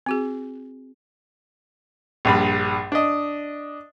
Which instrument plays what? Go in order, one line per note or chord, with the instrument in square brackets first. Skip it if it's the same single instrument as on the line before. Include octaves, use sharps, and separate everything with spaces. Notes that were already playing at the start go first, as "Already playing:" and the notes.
[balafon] C4 F#4 G#4
[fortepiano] A#1 G2 B5
D4 D#5